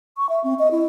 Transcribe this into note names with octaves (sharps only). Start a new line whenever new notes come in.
C#6
E5
C4
D#5
E4